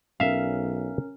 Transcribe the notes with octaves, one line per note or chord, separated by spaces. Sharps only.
B1 C#4 A#4 E5 F5